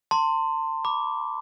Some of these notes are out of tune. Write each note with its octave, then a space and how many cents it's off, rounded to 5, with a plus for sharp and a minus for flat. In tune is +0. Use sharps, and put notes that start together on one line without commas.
A5 +35 C6 +0
B5 -20 D6 -10